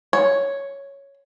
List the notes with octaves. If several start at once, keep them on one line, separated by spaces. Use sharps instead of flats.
C#5